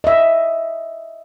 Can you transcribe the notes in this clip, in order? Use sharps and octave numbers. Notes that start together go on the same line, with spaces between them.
D#5 E5